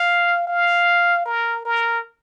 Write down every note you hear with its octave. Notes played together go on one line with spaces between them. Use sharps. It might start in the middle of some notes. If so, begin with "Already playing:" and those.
Already playing: F5
F5
A#4
A#4